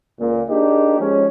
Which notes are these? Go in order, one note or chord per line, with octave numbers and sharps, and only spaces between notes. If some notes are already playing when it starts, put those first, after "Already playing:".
C#2 A#2
A#3 D4 D#4 G4 G#4
F3 G#3 C#4